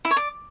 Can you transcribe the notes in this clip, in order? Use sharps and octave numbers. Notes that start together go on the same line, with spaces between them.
E4
C#5
D5